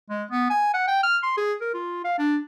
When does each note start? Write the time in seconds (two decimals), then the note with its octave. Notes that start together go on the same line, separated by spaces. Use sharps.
0.10 G#3
0.31 B3
0.50 G#5
0.74 F#5
0.88 G5
1.03 F6
1.23 C6
1.37 G#4
1.61 A#4
1.74 F4
2.04 F5
2.18 D4